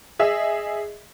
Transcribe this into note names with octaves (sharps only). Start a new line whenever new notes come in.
G#4 D#5 E5